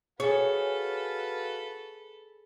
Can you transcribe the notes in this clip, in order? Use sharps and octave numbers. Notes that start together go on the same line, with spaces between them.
F#4 G#4 A4 B4 C#5 F5